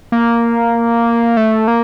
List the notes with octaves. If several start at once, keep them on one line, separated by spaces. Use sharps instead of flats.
A#3
A3
A#3